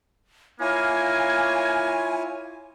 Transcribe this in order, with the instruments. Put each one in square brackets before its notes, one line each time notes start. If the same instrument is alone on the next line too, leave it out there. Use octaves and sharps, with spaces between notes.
[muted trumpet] A#3 [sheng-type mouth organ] E4 F4 C#5 [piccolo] G#5